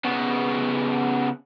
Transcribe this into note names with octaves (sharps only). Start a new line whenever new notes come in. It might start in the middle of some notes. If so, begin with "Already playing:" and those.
C#3 B3